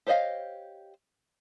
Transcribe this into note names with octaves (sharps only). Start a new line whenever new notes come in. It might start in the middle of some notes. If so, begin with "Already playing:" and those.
G4 C5 C#5 D#5 F5